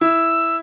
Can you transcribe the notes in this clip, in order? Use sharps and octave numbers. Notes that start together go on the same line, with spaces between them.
E4 E6